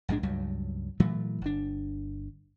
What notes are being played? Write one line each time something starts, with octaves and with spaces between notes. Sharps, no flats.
A#1 G#2 G#3 D4
C#2 G2 F#3 G3
A#2 E3 F#3 A3
G1 D4